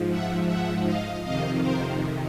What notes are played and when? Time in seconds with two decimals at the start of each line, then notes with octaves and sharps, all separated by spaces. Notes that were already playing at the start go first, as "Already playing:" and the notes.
Already playing: G#2 F3
0.10 E5 F#5
0.48 E5 F#5
0.85 D#5 F5
1.23 F2 C3 D#3 D#5 F5
1.61 A#4 C5